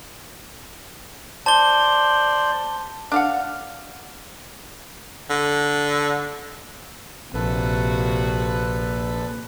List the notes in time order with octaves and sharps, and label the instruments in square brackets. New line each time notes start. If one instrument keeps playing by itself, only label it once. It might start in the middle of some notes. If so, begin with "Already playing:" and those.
[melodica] C5 D5 [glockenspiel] A5 G7
[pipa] D4 F5 F#5
[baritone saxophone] D3
[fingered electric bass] A#1 [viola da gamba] C3 F#4 [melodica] A4 B4